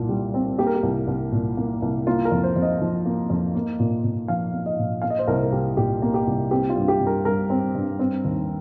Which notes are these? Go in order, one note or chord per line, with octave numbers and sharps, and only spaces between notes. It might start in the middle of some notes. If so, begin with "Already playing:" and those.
Already playing: C2 A#2
G3
C4
A#3 G4
A#4
G4
C2
C2
A#2
A#3
C2
A#3 F4
A#4
F2
C5
F2
D#5
F3
A#3
F2
A#3
A#2
A#2
F3 F5
A#3
D#5
A#2
A#3 F5
D#5
C5
C2 A#4
A#4
C2 G4
A#2 G4
A#3
G4
C2
C4 G4
F4
G2
G4
G2
A#4
G3 A#4
C4
G2
C4
D#2